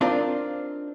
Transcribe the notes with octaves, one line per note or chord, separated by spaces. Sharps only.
C4 D4 D#4 F4 A#4 D5